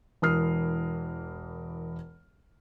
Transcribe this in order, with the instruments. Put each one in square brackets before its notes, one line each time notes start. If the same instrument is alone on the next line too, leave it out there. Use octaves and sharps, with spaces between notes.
[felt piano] E1 E3 A#4 D#6 F6 C7